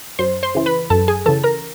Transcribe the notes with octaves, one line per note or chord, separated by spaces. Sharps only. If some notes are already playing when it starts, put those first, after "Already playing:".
F#2 C5 C6
C5 C6
C#3 E3
B4 B5
F#2 A4 A5
G#4 G#5
C#3 E3 A4 A5
A#4 A#5